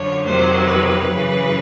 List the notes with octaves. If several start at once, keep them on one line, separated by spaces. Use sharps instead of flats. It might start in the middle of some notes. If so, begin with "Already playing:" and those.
Already playing: F#2 D3 F3 C#5
F2 C3 D#3 F#3 C5
B4
F#2 C#3 E3